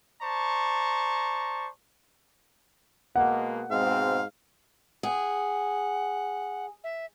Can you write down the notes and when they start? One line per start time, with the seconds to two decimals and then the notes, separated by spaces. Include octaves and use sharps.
0.22 C5 D5 A5 A#5 C#6
3.16 B2 G#3 A#3 F#5
3.71 G#2 B2 G#3 C4 F5
5.03 G#4 F#5
6.84 E5